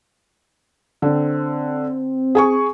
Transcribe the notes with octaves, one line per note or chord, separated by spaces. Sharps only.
D3 C4
G#4 G#5 C#6